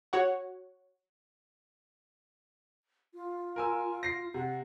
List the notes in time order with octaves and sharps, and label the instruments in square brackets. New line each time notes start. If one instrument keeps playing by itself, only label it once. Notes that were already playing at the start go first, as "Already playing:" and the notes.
[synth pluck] F#4 C#5 F#5
[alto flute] F4
[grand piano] A#4 G#5 E6
A#6 C7
[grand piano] C3 [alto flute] F#5